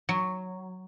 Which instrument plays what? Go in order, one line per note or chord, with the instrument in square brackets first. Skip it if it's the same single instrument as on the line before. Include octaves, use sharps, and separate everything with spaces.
[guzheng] F#3